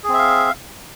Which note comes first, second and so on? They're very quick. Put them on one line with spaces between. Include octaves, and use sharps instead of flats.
G#4 C4 E5 F5